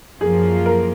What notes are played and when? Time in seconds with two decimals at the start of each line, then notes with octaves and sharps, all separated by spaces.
0.21 F#2 F3 A#3 F4 G#4
0.66 A#4